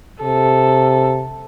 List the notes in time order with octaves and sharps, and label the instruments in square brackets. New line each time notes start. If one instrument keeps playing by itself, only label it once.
[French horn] C3 [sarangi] A4